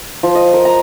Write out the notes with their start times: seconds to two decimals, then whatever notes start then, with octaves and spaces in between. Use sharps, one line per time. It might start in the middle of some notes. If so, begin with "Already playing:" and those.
0.23 F3
0.35 D#5
0.54 A#4
0.65 A#5